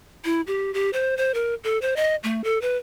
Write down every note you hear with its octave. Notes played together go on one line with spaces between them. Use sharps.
E4
G4
G4
C5
C5
A#4
A4
C5
D#5
A3
A4
B4